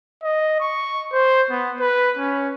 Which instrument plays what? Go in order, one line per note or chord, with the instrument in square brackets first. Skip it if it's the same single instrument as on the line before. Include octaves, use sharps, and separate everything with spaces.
[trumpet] D#5
C#6
C5
B3
B4
C#4